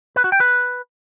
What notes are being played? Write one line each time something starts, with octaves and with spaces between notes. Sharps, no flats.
B4
F#4
G5
B4